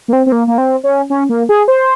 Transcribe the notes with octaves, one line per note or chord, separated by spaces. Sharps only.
A#3
C4
C4
A#3
A#3
C4
C#4
C#4
A#3
G#4
C5